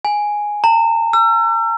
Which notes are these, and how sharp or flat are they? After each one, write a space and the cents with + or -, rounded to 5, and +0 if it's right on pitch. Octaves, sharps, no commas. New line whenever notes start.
G#5 +0
A#5 -35
E6 +40